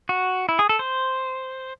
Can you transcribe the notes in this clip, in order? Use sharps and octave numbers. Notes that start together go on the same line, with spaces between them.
F#4
E4
G#4
A4
C5